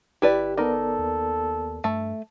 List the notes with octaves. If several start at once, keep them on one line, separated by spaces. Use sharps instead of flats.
G1 E4 G4 B4 D5
B3 D#4 A4 A#4 D5
D#2
G2 A3